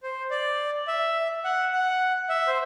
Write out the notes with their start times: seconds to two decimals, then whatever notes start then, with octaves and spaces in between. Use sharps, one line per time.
0.03 C5
0.31 D5
0.88 E5
1.45 F#5
1.73 F#5
2.29 E5
2.47 C5